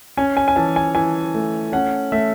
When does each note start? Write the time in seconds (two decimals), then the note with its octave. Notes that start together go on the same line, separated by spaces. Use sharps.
0.17 C#4 G#5
0.37 G#5
0.48 G#5
0.56 E3 A5
0.76 G#5
0.95 E3 G#5
1.34 A3
1.72 C#4 F#5
2.12 A3 E5